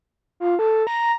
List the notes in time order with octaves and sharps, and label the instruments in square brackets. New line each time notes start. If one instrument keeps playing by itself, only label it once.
[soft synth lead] F4
A4
A#5